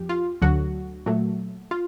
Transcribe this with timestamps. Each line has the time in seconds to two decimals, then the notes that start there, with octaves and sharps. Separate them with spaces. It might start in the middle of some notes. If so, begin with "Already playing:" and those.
Already playing: F2 F3 G4
0.09 F4
0.42 D2 D3 F#3 F#4
1.06 A#2 F#3 A3
1.71 F4